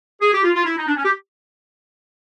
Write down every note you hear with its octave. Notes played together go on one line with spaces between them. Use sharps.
G#4
G4
F4
F4
E4
D#4
D4
C#4
G4